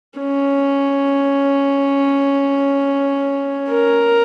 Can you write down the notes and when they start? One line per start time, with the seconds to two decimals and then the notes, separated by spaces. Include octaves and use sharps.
0.19 C#4
3.70 A#4